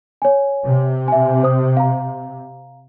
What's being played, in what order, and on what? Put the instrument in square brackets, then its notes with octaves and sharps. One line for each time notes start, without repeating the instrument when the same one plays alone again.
[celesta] C#5 G#5
[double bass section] C3
[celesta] E5 G#5
C5 D#6
F5 A#5